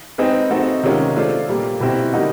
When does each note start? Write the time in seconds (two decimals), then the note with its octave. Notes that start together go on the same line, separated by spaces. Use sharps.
0.18 G#3 C4 D#4 G#4 B4
0.51 A3 C4 D#4 F#4 A4
0.83 C3 D#3 G#3 C#4 F4
1.16 A3 D4 F4 A4 C5
1.48 A#2 G3 A#3
1.80 B2 G3 C4 E4
2.13 D3 G3 A#3 D#4 F#4